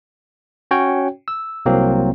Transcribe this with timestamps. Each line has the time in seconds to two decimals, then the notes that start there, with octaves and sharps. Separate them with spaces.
0.71 C#4 F#4 C#5 G5
1.28 E6
1.66 C2 F#3 A#3 C4